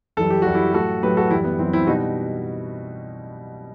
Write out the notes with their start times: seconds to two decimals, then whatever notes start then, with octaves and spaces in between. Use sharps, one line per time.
0.17 F#2 E3 G3 A4
0.30 G4
0.42 F#2 E3 G3 F#4
0.54 E4 G4
0.74 A2 F#3 F#4 A4
1.03 A2 F#3 G4 B4
1.17 F#4 A4
1.30 F#2 E3 G3 E4 G4
1.44 B3
1.59 F#2 E3 G3 C4
1.73 C4 E4
1.87 B2 G3 D#4 F#4